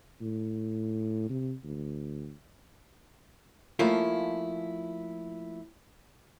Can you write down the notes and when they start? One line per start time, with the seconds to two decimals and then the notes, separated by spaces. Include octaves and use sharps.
0.21 A2
1.29 C3
1.64 D2
3.79 F3 A3 A#3 C#4 E4 F4